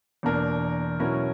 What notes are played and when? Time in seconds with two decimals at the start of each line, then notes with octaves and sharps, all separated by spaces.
0.23 E2 B2 A#3 D4 A#4
1.00 B2 F#3 C#4 E4 A#4